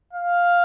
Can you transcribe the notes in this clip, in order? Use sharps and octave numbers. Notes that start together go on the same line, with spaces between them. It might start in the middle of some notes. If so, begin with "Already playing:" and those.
F5